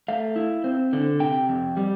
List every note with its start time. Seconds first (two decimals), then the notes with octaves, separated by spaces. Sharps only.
0.08 A3 F5
0.36 E4
0.64 C4
0.93 D3
1.20 C3 G5
1.49 F2
1.77 G3